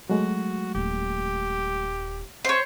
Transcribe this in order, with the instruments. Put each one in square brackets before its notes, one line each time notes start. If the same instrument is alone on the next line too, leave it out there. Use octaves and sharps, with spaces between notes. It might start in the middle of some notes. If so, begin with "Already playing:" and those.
[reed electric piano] F#3 G#3 A3 [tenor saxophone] F#4
[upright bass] D#1 [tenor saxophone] G4
[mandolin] C5 C#5